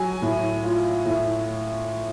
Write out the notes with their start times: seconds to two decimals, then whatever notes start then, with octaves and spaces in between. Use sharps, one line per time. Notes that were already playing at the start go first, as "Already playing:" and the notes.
Already playing: F#3 G#5
0.22 A2
0.64 F4
1.06 A2